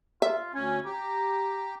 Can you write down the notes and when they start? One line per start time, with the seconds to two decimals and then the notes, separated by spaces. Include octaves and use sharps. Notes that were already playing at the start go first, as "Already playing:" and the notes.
0.22 F4 E5
0.55 D2 C#4 G#5
0.85 G4 A#5